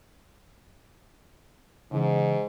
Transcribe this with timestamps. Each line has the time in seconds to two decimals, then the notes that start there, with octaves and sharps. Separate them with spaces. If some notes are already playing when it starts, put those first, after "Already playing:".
1.92 G#2 C#3 E3